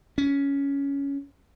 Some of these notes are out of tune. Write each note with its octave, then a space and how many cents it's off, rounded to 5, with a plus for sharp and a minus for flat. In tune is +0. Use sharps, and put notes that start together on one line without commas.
C#4 +10